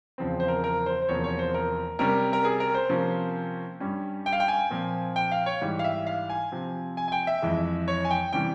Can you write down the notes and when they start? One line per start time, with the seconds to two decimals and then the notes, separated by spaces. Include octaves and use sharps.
0.18 E2 C#3 F3 C4
0.40 C5
0.48 A#4
0.64 A#4
0.86 C5
1.02 C5
1.09 E2 C3 F3 A#3 C#5
1.24 C#5
1.39 C5
1.54 A#4
1.99 C3 G3 C#4 A#4
2.33 A#4
2.45 G#4
2.60 A#4
2.75 C5
2.89 C3 F3 A#3 C#4
3.80 G2 G3 C#4
4.26 G5
4.33 F5
4.40 G5
4.48 G#5
4.71 A#2 F3 C4
5.16 G5
5.32 F5
5.46 C#5
5.61 G#2 E3 G3
5.79 F5
5.84 E5
6.07 F5
6.30 G#5
6.52 C3 F3 C4
6.97 G#5
7.08 G#5
7.12 G5
7.27 E5
7.42 F2 E3 G#3
7.88 C#5
8.05 G#5
8.10 G5
8.33 C3 E3 G3 C#4 G5